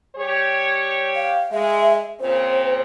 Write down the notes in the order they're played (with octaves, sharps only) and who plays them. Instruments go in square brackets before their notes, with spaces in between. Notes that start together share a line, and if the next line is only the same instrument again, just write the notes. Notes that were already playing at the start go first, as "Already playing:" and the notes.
[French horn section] G3 G4 C#5
[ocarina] F5
[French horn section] G#3 [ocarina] E5
[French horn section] A#2 C#3 C4 [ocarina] C5